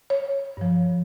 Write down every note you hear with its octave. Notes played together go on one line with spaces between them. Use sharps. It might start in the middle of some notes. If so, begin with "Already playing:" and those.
C#5
G2 F3